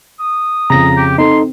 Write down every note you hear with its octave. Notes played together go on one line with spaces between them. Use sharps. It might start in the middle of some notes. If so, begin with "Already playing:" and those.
D#6
F2 C#3 A#5 A#6
G4
C4 D#4 A4 C6